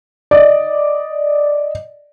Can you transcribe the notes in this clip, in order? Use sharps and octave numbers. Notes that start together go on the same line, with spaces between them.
D5 D#5